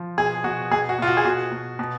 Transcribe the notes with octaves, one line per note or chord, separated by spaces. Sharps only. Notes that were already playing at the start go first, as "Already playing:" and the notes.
Already playing: F3
B2 G#4
B2 F#4
B2 G#4
F#4
B2 F4
F#4
G#4
B2 F#4
B2
B2